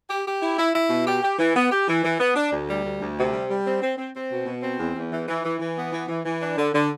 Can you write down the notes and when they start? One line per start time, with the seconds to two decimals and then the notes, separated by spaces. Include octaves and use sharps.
0.09 G4
0.26 G4
0.42 E4
0.58 E4
0.75 E4
0.90 B2
1.07 G4
1.23 G4
1.39 E3
1.55 B3
1.71 G4
1.87 E3
2.04 E3
2.20 B3
2.36 D4
2.52 D2
2.69 G3
2.84 D2
3.01 D2
3.18 C3
3.33 G3
3.49 G3
3.65 C4
3.82 C4
3.97 C4
4.14 C4
4.31 B2
4.46 B2
4.63 C4
4.79 E2
4.96 E2
5.12 E3
5.28 E3
5.44 E3
5.60 E3
5.76 B3
5.93 E3
6.08 E3
6.25 E3
6.41 D4
6.57 D3
6.74 D3